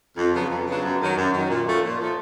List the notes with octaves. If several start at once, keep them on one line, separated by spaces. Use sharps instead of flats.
F2
C#3 F#3 B3 D4
F2
C#3 F#3 B3 D4
F#2
D#3 F#3
F#2
D#3 F#3
A#2
F3 A3
A#2
F3 A3